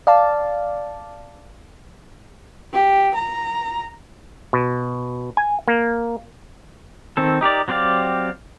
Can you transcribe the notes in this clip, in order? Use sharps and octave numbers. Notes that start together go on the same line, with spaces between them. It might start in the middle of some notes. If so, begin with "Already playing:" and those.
D5 F5 A5
G4
A#5
B2
G#5
A#3
D#3 C4 A4
D#4 G4 A#4 D5
F#3 C4 G4 D5 F5